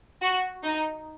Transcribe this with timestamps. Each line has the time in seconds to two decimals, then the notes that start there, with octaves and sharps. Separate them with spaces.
0.22 F#4
0.64 D#4